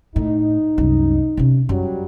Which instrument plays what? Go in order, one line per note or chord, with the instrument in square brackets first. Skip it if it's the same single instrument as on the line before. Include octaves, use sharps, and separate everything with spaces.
[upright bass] A2 [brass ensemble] D#4
[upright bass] C2 F#2
C3 C#4
[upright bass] F#2 [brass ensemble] F#3 G3